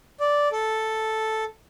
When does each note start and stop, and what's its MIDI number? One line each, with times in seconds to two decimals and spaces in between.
0.20 0.49 74
0.52 1.44 69